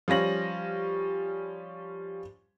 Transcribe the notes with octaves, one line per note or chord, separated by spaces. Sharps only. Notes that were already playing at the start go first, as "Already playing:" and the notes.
F3 G3 C#4 A#6 F#7